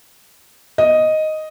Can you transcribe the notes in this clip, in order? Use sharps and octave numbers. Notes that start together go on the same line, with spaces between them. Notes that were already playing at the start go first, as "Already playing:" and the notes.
D#5